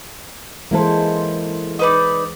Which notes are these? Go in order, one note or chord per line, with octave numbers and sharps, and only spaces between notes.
E3 G#3 A#3 E4 A4 C5
D#4 B4 D5